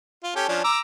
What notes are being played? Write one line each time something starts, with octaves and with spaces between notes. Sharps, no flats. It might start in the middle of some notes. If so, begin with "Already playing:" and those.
F4
C#4 G4 A4
F3 C#4 D4
A#5 D6 E6